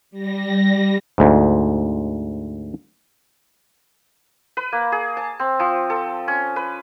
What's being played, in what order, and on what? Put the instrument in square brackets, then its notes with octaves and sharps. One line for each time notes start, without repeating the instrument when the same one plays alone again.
[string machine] G3 A#6
[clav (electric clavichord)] D2 G#2
[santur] B4
A#3
G#4
A5
C4
F3
A4
C#4
B4